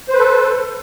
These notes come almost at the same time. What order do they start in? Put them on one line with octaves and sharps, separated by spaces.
C5 B4 A4